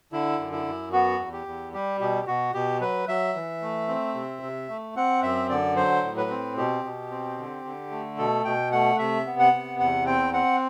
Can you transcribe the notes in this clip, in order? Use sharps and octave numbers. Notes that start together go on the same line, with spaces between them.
D3 E4
F#2
E4
F#2
B3 F#4
E2
G4
E2
G3 G4
B2 G4
B2 F#4
B2 G4
F#3 B4
F#3 E5
E3
A3
C4
C3
C3
A3
C4 F#5
F#2 E5
D3 D5
F#3 C5
A2
B4
C4
B2 G4
B2
C4
D3
D3
A3
B2 A4
B2 G5
A3 F#5
C3 E5
B3
F#5
C3
E2 F#5
C4 G5
C4 F#5